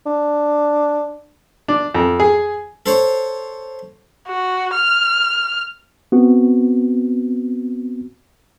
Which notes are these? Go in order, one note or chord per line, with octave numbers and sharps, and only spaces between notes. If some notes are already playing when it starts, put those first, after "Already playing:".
D4
D4
F2
G#4
A4 C5 C#5
F#4
F6
B3 C4 F#4